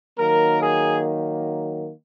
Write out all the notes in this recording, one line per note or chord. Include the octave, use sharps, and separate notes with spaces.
D#3 F#3 A#3 A#4
G#4